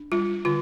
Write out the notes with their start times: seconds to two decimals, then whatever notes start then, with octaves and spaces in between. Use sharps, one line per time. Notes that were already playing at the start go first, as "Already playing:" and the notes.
Already playing: D4
0.12 G3 F4
0.45 D3 F4